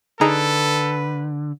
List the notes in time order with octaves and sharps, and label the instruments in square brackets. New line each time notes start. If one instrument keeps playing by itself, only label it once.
[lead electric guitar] D3 [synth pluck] D#4 G#4 A#5 [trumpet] A4 [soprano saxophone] B4